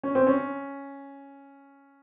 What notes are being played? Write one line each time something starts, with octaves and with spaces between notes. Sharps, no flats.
C#4
C4
C#4